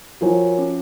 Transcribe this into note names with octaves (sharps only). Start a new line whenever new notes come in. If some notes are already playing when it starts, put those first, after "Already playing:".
F3 F#4 A#4 C#5 G#5
C#4